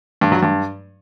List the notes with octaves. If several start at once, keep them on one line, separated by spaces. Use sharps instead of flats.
G2
F#3
G2